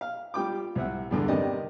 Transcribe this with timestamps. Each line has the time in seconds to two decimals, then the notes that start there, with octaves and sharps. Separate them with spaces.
0.01 F5
0.34 G3 F4 G5 D6
0.75 C2 C4 E5 F#5
1.11 E2 G2 D3
1.28 C3 D#3 B3 G4 D5 D#5